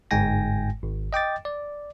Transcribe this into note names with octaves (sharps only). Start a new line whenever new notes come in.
G1 G#2 G#3 G5 G#5 A#6
G#1
D#5 G5 D6 A6
D5